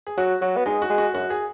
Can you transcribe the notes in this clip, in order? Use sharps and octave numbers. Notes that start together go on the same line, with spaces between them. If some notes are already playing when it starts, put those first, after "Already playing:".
G#4
F#3 F#4
F#3 F#4
B3
G#3 D#4
F#4
G#3
F#4
F#2 F#4
G#4